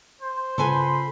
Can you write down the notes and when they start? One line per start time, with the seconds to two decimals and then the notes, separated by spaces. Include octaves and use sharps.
0.21 C5
0.58 C#3 F4 A4 B4 G#5 B5 C6